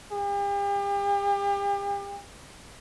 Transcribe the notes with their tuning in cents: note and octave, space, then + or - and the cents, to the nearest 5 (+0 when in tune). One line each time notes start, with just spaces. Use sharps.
G4 +40